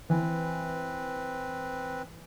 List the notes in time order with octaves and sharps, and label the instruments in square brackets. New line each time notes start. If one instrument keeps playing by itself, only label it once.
[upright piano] E3 [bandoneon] C4 B4